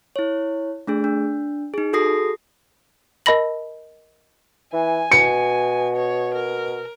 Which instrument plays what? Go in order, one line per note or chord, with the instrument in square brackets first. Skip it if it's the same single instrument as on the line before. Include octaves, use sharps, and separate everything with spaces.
[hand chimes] E4 C#5
A3 D4 G#4
D4
D#4 G#4
F#4 G#4 A4 D#6 A#6 C7
[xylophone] A#4 D#5 A5 B5 A#6 F#7
[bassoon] E3 [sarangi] G#5
[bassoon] B2 [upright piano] C#7
[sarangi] C#5
A#4